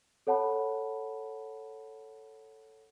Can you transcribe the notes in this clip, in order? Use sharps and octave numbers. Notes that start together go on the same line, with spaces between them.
A4 C#5 F#5 A5 B5